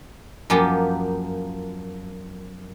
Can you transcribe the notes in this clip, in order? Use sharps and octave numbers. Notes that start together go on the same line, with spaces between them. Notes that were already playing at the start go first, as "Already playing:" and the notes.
F#2 F3 A#3 B3 G4